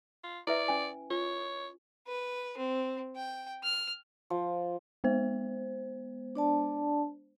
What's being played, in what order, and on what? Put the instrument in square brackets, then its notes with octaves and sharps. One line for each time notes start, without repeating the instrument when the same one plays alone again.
[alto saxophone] F4
[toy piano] E4 B4 E5 [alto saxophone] D5
[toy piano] C#4 G#5
[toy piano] F4 [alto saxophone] C#5
[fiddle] B4
C4
G5
F6
[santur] F3
[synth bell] G#3 B3 C5
[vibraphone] D4 D5 A5